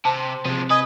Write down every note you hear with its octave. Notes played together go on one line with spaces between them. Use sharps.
C3 C5 A5
C3 F3 G#3
B4 D#5 G#5 D#6